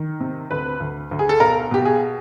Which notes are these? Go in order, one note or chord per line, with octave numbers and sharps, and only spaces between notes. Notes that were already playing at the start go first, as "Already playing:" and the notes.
Already playing: D#3
C3
D2 B4
D2
D2
G#4
A4
B1 A#4
B2 G4
G#4